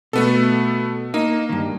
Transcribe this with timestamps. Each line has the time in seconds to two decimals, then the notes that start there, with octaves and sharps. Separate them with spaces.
0.13 B2 A3 B3 A4
1.14 A#3 D#4
1.49 G2 D#3